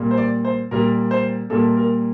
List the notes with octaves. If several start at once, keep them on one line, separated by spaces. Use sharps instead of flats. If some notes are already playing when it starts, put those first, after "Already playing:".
Already playing: A#2 G3 A#3
C5
D5
C5
A#2 G3 A#3 A#4
C5
A#2 G3 A#3 A4
A#4